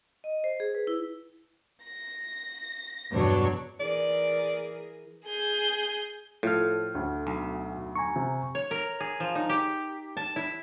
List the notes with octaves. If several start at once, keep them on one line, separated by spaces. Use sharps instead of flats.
D#5
C5
G#4
B4
E4
A#6
E2 G2 B2 F#3 D4 C#5
E3 G#4 A#4 D5
G#4 G6
A2 F3 A3 F4 A4 F6
D2
B1
G#5 A#5 C#6
C3
C#5
A#4
G#4
F3
D#4
G4
A5
E4